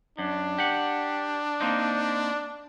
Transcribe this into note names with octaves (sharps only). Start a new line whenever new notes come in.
F#2 D4
G4 F#5
A#3 C4 D#4